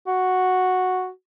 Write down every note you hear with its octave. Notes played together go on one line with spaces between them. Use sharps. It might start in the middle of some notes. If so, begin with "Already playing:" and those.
F#4